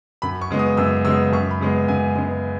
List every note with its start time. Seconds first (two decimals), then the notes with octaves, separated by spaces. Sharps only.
0.22 F#2 B5
0.41 C#6
0.50 C#3 G#3 B3
0.59 D#6
0.77 F#2 E6
1.05 C#3 G#3 B3 E6
1.32 F#2 C#6
1.51 B5
1.61 C#3 G#3 B3
1.88 F#2 G#5
2.15 C#3 G#3 B3